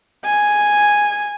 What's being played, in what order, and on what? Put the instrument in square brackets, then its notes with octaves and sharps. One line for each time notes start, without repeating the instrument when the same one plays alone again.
[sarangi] G#5